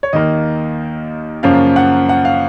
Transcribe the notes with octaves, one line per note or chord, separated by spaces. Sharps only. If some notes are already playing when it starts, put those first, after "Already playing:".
C#5
D#2 D#3 A#3 D#5
F#2 C#3 F3 A#3 C#4 F5
F#5
F#5
F5